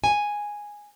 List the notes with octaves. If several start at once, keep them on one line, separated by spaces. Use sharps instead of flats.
G#5